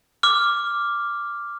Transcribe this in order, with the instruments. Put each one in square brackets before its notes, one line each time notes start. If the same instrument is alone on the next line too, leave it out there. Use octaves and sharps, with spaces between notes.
[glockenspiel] D6 F6